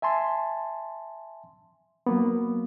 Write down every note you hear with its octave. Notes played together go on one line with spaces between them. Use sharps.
E5 G#5 A5 C6
F#3 A#3 B3